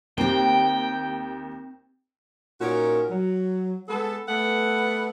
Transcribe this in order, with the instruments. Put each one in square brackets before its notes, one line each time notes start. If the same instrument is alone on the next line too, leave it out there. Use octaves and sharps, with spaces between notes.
[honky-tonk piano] D#2 [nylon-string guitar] C4 G4 [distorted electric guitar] G5
[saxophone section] A#2 C#4 D#4 F#4 A#4
F#3
G#3 B3 A4
A3 B3 A4 B4 F#5